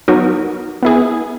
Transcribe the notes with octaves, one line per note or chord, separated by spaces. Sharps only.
F#3 B3 D#4 F#4 A#4
B3 E4 G#4